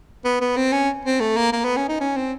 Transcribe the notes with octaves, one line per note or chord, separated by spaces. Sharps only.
B3
B3
C4
C#4
C4
A3
A#3
A#3
B3
C#4
D#4
C#4
C4